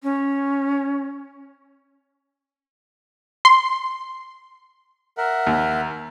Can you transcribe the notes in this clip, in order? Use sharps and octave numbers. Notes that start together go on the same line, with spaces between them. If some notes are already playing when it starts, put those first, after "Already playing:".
C#4
C6
A#4 E5 F#5
D#2